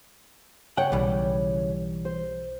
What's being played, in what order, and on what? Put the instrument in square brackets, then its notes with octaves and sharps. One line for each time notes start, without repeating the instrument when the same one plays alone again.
[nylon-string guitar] C#3 C#5 [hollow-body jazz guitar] F#5 G5
[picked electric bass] B1 [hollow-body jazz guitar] E3 G3
[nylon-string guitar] C5